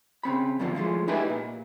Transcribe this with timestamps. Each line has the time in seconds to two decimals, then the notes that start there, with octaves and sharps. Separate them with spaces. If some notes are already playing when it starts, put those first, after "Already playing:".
0.23 C#3 C4 B5
0.59 G2 B2 D3 F3 F#3
0.75 E3 F3 G#3 A3
1.08 D#4 E4 G4 G#4 B4 D#5
1.30 A#2